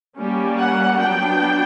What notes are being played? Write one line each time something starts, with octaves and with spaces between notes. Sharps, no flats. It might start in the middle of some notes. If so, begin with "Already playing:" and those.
G3 A#3 C#4
F#5
F#3 B3 D4 G5